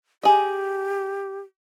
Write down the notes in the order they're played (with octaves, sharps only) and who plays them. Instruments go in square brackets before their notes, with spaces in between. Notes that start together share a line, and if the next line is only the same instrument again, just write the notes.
[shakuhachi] G4 [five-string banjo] G#4 D#5